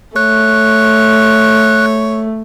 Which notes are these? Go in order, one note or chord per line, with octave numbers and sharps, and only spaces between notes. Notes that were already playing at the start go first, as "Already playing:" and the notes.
A3 C#5 F#6